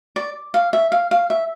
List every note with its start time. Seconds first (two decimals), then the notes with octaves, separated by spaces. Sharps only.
0.16 D5
0.54 F5
0.73 E5
0.92 F5
1.11 F5
1.30 E5